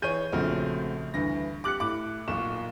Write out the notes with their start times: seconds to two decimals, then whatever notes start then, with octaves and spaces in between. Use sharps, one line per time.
0.02 E3 G#4 C#5 G6 D#7
0.32 A#1 C#3 F3 A3 C4 F#4
1.14 D2 G2 E3 A#6
1.64 G4 D6 F#6 C#7 F#7
1.80 A2 D6
2.28 B1 A#2 C#6 E7